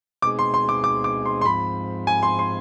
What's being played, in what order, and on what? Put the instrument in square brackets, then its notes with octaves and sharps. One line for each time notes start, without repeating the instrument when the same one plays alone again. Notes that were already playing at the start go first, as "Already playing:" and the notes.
[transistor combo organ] B2 G#3 C4 D#4 G#4 [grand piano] D6
[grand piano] C6
C6
D6
D6
D6
C6
C6
[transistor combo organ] G#2 F3 C4 [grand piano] B5
[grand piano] G#5
C6
C6